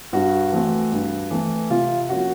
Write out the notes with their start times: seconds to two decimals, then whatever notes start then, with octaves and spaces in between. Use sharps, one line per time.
0.13 G2 F#4
0.53 E3 A3 C4
0.92 G2
1.31 E3 A3 C4
1.70 C3 F4
2.09 F3 A#3 C#4 F#4